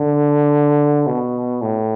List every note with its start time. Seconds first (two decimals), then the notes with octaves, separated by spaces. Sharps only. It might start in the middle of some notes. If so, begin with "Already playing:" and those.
Already playing: D3
1.07 B2
1.62 A2